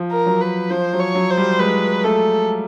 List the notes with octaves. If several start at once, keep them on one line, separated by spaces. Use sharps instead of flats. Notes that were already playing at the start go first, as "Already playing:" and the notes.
Already playing: F3
A#4
F#3
B4
F3 C5
F#3
C#5
F#3
C5
G3
G#3 B4
A3 A4